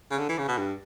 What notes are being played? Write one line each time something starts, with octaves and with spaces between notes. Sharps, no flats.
C#3
D3
E3
C#3
B2
G2